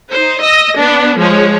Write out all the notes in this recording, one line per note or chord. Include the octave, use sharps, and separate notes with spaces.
D#4 C5
D#5 E6 A#6
B3 D4
F3 G#3 C#5